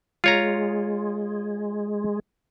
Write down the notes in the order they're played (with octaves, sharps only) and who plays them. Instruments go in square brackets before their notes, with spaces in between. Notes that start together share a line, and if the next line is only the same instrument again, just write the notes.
[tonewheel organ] G#3 [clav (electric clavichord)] F4 C#5 A#5